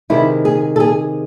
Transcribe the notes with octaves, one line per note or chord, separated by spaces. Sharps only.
C3 D#3 G#3 E4
G#4
A4
G#4